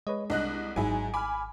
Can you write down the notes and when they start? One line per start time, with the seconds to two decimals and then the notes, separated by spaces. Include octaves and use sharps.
0.07 G#3 B4 C#5 D#5
0.30 C2 D4 D#5 F#6
0.76 G#1 G#2 F#3 E4 G#4 G#5
1.14 G#5 B5 D6 F6